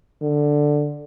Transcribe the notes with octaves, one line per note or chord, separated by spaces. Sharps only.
D3